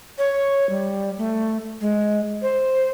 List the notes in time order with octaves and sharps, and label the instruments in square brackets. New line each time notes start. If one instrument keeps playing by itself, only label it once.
[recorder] C#5
G3
A3
G#3
C5